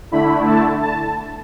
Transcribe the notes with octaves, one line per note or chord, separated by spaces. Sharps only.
D3 A3 E4 B5
A5
A5